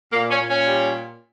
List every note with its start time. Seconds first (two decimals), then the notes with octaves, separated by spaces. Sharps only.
0.13 A#2 A#3
0.31 C#4
0.40 A#2
0.49 C#4
0.67 G3